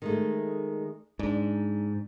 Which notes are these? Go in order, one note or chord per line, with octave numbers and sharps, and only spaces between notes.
D#3 G#3 A3
G#2 D4